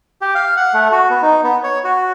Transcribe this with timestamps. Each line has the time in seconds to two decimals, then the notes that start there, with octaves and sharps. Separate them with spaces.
0.21 G4
0.35 F5
0.57 F#5
0.74 A3
0.92 F#4
1.10 B3
1.22 D#4
1.44 B3
1.64 C#5
1.84 F#4